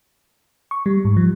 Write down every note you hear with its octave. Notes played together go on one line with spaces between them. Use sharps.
C#6
G3
G#2
F3